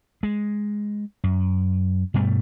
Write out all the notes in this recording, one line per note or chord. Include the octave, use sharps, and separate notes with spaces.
G#3
F#2
G2 B2 G3 A3